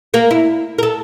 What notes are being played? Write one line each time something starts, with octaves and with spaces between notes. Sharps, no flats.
A#3 A#4
E4
A4 A#4